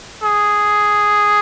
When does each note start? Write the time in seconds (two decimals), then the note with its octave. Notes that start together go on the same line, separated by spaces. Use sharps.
0.23 G#4